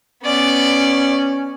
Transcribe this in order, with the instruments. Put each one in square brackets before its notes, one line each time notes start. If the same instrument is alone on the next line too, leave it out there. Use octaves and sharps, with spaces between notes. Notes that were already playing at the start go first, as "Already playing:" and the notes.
[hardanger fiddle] B3 D5 [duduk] C#4